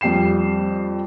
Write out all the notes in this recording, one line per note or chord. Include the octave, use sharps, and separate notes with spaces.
F2 G3 G5 C7 E7